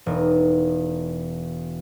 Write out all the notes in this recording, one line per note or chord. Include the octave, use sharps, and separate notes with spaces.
E1 D#4